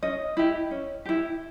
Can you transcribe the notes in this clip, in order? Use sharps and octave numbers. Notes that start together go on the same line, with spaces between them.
C#4 D#5
E4 G4
C#4
E4 G4